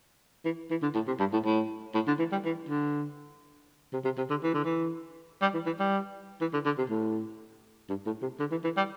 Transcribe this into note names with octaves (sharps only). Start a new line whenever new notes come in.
E3
E3
D3
A2
C3
G2
A2
A2
A2
D3
E3
G3
E3
D3
C3
C3
C3
D3
E3
D3
E3
G3
E3
E3
G3
E3
D3
D3
C3
A2
G2
A2
C3
D3
E3
E3
G3